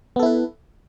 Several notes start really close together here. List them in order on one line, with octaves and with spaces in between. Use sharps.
B3 A4 E4 B4